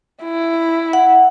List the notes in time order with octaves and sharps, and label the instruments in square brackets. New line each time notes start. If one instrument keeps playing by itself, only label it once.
[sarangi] E4
[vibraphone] F#5